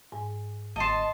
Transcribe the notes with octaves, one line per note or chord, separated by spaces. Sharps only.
G#2 G#5
G1 D#5 A5 C6